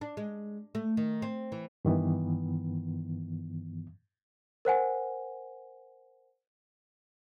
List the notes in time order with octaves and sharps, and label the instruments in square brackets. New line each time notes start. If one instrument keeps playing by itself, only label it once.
[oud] D4
G#3
A3
D#3
C4
E3
[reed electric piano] G2 D#3 E3 B3
[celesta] A#4 C5 F#5 G#5